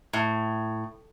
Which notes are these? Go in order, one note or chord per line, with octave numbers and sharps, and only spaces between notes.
A2